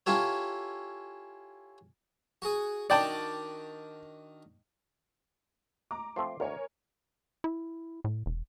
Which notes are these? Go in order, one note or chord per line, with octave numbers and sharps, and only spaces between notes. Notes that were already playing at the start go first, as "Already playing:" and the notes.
C#4 E4 F4 G4 A4 C#5
F#4 G#4
D#3 D4 F#4 D5 G5 A5
A#5 D6
F3 A3 C4 C6
D2 A#4 C#5 G#5
E4
A2
E1